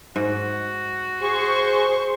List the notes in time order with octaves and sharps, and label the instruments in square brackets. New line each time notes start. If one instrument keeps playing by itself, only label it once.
[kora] G#2 [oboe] F#4
[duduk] G#4 [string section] C5 C#6